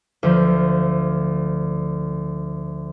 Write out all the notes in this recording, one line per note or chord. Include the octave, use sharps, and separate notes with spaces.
D2 F3 C5